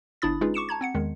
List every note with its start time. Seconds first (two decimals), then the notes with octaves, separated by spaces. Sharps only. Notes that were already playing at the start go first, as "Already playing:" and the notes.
0.22 G1 D4 E4 B5 D#6 A6
0.41 G#3 C#4 D#4 F4 G#4 B4
0.54 C#6 D6 C#7 E7
0.69 A5 A#5 G#6
0.81 C4 F#5 C#7
0.95 E2 D#3 G#3